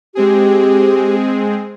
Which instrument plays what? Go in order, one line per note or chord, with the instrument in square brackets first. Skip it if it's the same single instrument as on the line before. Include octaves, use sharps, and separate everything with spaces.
[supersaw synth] G#3 C4 G#4 [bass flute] G4